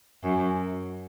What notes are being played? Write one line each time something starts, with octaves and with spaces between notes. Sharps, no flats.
F#2